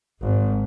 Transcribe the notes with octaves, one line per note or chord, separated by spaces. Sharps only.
G#1